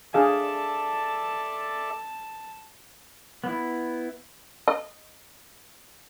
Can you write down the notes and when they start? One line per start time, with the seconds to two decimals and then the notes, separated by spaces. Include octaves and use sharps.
0.14 D4 G#4 A4 D5 E5 F5 A5
3.44 B3 E4
4.68 D#5